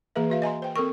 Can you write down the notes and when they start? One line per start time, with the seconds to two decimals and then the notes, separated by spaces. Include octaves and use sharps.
0.16 E3 A#3 G#4 B4 E5
0.30 F#4 E5 F5
0.42 D#5 G#5 A#5 C6
0.62 C5 G5
0.76 C4 A4 A#4 C#6